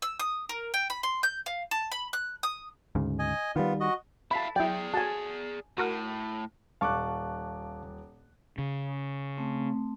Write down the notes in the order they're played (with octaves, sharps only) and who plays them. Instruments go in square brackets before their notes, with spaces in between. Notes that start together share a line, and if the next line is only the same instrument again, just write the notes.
[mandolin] E6
D#6
A#4
G5
B5
C6
G6
F5
A5
B5
F#6
D#6
[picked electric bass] D2 G#2 C#3
[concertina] D#5 G#5
[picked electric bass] D#3 G3 [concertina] B3 F4
[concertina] F#4 D#5
[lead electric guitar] E4 F5 [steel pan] A5 B5
[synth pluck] F#3 E4 [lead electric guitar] G#4 D5 [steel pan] G5
[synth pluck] F#4 [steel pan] G#5 A5
[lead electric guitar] A2 [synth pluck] F#4 A#4 F#5
[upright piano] D#1 D6 F#6 [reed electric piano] F5 A5 C#6
[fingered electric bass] C#3
[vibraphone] A3 C4